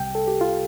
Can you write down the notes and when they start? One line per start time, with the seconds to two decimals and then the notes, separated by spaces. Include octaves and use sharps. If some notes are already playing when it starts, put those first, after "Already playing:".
Already playing: C2 C3 G3 G5
0.15 A4
0.28 G4
0.41 F4